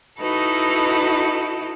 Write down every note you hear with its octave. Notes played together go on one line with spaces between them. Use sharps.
D#4 E4 F#4 A4 B4